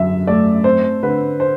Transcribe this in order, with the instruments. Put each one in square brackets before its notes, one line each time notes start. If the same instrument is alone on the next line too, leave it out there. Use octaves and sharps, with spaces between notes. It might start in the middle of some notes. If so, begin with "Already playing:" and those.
Already playing: [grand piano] F#2 D3 [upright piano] E5
[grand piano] A3 [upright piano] D5
[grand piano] C4 [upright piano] C5
[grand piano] D3 [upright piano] B4
[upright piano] C5